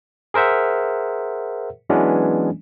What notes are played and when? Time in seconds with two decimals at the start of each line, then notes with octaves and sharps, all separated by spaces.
0.34 G#4 A#4 C5 E5 F#5
1.90 E3 F#3 G#3 B3 C#4 D4